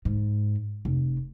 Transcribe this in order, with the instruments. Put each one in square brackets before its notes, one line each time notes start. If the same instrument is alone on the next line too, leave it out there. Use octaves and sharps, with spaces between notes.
[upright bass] G#2
F1